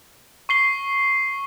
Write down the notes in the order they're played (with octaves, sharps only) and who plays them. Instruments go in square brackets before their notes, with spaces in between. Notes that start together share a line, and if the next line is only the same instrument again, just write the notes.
[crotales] C#6 C7 G7